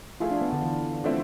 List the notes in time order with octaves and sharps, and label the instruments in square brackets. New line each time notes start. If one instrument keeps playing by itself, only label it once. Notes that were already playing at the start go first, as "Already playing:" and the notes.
[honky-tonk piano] F3 A3 E4 G#4 [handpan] F4
[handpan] D4
B3
D3
E3
[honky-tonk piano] D3 F3 A3 C4 E4